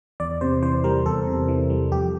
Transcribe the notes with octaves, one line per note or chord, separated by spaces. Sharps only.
E2 D5
C3 C5
E3 C5
G3 A#4
E2 A4
C3
E3
G3
F2 G4